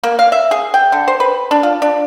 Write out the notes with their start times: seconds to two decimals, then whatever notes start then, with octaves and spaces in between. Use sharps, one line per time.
0.04 A#3
0.19 F5
0.32 E5
0.51 G#4
0.74 G5
0.92 D3
1.08 C5
1.20 B4
1.51 D4
1.63 F4
1.82 D4